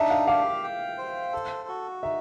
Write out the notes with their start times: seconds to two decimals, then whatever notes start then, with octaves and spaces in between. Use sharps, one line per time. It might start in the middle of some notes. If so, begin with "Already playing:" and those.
Already playing: D4 D#4 E5
0.10 F5
0.27 G4 F5
0.63 G5
0.98 C5
1.33 A4
1.68 F#4
2.03 D#4 E5